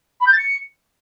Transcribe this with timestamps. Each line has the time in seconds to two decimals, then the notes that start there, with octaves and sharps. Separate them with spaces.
0.20 B5
0.26 G6
0.32 A6
0.38 C#7